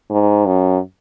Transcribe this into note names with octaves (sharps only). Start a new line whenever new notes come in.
G#2
F#2